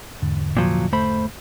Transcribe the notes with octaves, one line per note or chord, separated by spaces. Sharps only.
E2 G#2 D3
A#2 F3 F#3
A3 C5 B5